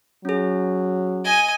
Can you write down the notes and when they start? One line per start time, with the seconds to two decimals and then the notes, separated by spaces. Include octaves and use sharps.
0.25 F#3 C#4 G#4
1.24 D#5 G#5